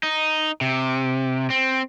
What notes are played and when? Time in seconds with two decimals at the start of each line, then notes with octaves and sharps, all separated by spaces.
0.03 D#4
0.61 C3
1.50 C4